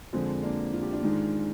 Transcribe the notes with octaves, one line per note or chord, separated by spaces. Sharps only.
F2 D3 F3 G#3 C4
A#3 D4
F4
G4
D4 F4
G#2 D#3 G#3